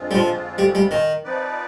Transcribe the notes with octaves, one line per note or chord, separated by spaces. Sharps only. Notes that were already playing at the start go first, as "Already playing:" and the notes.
Already playing: F2 D3 G#3 C4 F4
G3
F3
G3
G3
D#3
F3 C4 D#4 B4 D5